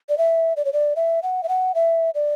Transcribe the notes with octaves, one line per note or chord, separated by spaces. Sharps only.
D5
E5
D5
C#5
D5
E5
F#5
E5
F#5
E5
D5